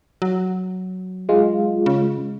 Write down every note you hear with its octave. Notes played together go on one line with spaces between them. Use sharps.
F#3
G#3 F4
C#3